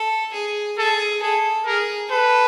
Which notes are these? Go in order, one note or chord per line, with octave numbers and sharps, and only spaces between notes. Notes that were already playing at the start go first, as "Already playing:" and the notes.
Already playing: A4
G#4
G#4 A4
G#4 A4
G#4 A#4
A4 B4